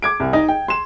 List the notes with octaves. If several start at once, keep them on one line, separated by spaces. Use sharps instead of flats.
D6 G#6 D7
C2
D#4 D#5
G5
C6 E7